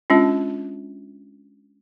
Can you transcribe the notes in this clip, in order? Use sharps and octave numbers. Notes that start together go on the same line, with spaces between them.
G#3 C#4 D4 F4